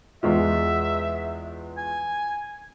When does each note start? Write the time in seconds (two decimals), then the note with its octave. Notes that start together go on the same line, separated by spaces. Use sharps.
0.23 E2 G#3 F4 E5
1.77 G#5